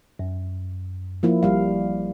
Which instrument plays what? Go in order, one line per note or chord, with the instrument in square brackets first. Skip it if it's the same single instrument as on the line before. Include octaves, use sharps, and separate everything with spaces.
[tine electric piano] F#2
[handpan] F3 A#3 E4
[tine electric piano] G#1 [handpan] G3 F5